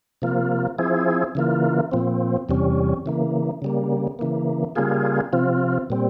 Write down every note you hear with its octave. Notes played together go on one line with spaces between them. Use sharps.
C3 F3 A#3 F4
F3 C4 E4 G#4
C#3 E3 A#3 F4
A#2 F3 C4
E2 C3 G3 C#4
C#3 E3 A#3
C#3 G3 A#3
C#3 E3 A#3
C#3 G3 A#3 F4 G#4
C3 F3 C4 F4
A#2 G3 C4